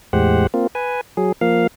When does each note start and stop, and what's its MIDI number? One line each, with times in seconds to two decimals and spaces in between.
0.13 0.47 40
0.13 0.47 45
0.13 0.47 56
0.13 0.47 67
0.13 0.47 72
0.13 0.47 78
0.54 0.67 58
0.54 0.67 60
0.54 0.67 65
0.75 1.01 71
0.75 1.01 80
1.17 1.32 54
1.17 1.32 68
1.41 1.67 53
1.41 1.67 58
1.41 1.67 77